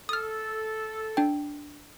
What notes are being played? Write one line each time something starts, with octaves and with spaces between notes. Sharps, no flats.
A4 D#6 F6
D4 G5